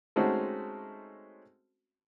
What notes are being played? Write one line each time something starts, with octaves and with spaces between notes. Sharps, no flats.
G#3 A3 C4 C#4 D#4 F#4